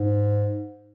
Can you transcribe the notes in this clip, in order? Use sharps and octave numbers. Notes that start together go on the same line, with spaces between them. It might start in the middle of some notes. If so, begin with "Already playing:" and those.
Already playing: G#2